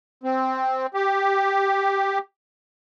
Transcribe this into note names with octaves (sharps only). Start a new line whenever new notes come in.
C4
G4